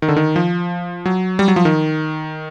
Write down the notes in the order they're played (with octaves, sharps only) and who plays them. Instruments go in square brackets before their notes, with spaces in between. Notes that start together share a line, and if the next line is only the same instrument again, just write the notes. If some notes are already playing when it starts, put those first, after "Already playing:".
[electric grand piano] D#3
D3
D#3
F3
F#3
G3
F#3
F3
D#3